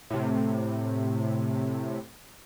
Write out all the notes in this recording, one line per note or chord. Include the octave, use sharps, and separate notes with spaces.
A2 C3